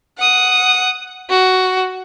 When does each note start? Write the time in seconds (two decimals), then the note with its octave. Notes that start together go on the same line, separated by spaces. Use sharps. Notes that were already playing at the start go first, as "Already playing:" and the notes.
0.18 F#5 D#6
1.30 F#4